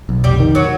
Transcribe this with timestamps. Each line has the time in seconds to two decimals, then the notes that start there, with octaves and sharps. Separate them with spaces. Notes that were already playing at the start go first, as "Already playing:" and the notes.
0.09 B1
0.24 F1 G3 G4
0.40 D#3
0.55 F#3 F#4